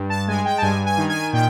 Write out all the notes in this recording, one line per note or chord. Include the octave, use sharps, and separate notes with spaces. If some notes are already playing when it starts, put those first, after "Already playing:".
Already playing: G2
A5
G#3 G#5
G5
A5
G2 G#5
G#5
D#3
G#5
A#2 G5